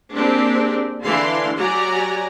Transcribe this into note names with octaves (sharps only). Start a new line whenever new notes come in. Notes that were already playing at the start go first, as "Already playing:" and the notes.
A#3 C4 D4 G4 G#4
D3 E3 D4 F5 C6
F#3 G4 D5 F#5 G#5 A#5